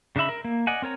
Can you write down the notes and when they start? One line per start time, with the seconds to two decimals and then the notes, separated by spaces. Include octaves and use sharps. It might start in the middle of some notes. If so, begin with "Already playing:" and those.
0.16 C#3 D4 D#4 E5 B5
0.29 A#4
0.45 A#3
0.67 D5 D#5 F#5 G#5
0.82 C4 A#4 C#5 A#5